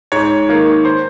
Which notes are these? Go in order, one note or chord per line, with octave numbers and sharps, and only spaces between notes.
G#2 C#5
D#3 A#3
C5